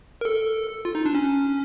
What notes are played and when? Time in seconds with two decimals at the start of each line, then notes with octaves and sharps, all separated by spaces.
0.21 A#4
0.25 A4
0.85 F4
0.95 D#4
1.05 D4
1.15 C#4